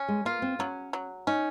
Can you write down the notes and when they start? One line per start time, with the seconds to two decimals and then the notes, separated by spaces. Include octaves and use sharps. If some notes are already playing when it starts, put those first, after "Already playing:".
Already playing: C#4
0.08 G#3
0.25 A#3 F4
0.42 C4
0.59 F#3 C#4
0.93 F#3
1.27 C#4 D#4